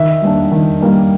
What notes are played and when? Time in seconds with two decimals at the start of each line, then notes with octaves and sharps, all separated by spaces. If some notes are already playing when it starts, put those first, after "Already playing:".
Already playing: D#3 E5
0.22 G3 A#3 D4
0.51 D#3
0.81 G3 A#3 D4